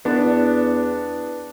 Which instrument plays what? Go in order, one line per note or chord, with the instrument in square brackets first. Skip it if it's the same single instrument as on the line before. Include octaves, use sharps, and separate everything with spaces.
[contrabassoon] E2 [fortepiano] B3 D4